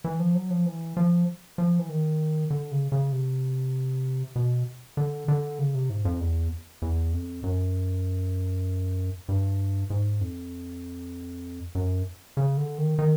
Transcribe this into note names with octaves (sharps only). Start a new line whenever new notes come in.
E3
F3
F#3
F3
E3
F3
F3
E3
D#3
D3
C#3
C#3
C3
B2
D3
D3
C#3
C3
G#2
F2
E2
E2
F2
F#2
G2
G#2
F2
F#2
C#3
D3
D#3
D#3